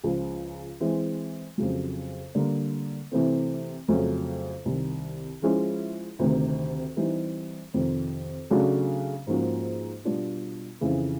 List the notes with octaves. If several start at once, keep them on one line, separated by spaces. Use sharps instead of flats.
C#2 C#3 F3
E3 G#3 C4
F2 C#3 F#3
D3 G3 A#3
C3 E3 A3 C4
F2 C#3 F#3 A3 C#4
C2 C3 D#3
F3 G#3 C#4 E4 G#4
D2 C3 D#3
E3 G3 C4 D#4 G4
F2 C3 D#3
C#3 F#3 A3 D4 F#4
G#2 F3 A#3 C#4 F#4
B2 G3 B3 D4 F4
F2 C#3 E3